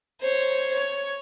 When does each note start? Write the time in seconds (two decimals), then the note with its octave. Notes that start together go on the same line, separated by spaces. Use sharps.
0.21 C5 C#5
0.73 C#5